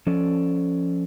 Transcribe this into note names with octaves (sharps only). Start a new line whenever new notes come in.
F3 C#4 A4 D5